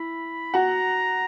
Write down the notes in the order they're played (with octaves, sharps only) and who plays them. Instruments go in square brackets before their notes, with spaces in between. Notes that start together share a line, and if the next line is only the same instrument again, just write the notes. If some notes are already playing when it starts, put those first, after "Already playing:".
Already playing: [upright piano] E4 [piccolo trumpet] B5
[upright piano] F#4 F#5 [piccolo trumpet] A#5